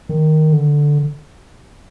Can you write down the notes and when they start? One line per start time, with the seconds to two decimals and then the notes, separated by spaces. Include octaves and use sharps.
0.09 D#3
0.52 D3